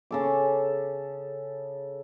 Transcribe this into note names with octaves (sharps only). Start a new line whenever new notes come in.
C#3 A4 D6